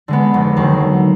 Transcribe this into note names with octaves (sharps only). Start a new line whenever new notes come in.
D3 G#3 B3
F1
D#2 D3 F#3